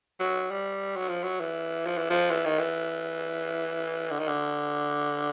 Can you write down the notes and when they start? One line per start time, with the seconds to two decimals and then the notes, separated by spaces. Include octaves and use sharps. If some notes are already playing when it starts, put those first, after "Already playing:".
0.20 F#3
0.51 G3
0.96 F#3
1.09 F3
1.23 F#3
1.40 E3
1.86 F3
1.98 E3
2.10 F3
2.31 E3
2.45 D#3
2.59 E3
4.11 D3
4.19 D#3
4.28 D3